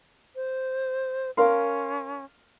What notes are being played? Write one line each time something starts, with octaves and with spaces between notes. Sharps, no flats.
C5
C#4 A#4 F5 C6